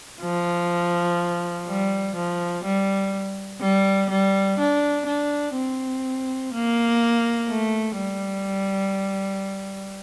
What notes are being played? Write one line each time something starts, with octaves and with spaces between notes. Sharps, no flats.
F3
G3
F3
G3
G3
G3
D4
D4
C4
A#3
A3
G3